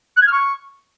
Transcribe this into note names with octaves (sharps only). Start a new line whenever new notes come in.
F#6
G#6
F6
C#6